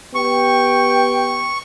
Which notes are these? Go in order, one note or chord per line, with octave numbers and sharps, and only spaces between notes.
B3 G4 G5 C#6